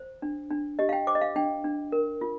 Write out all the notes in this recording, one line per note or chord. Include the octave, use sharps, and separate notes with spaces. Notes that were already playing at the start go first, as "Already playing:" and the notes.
Already playing: C5
D4
D4
G4 D#5
F5
G5
C5 D6
D#5
F5
D4 G5
D4
A#4
F4